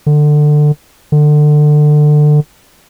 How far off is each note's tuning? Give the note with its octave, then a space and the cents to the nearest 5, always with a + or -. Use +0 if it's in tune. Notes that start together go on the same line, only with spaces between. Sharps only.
D3 +20
D3 +25